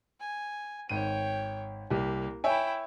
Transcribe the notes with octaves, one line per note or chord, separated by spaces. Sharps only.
G#5
G#1 C#5 G5 D#7
C2 A#3 G4
E4 C#5 E5 G5 G#5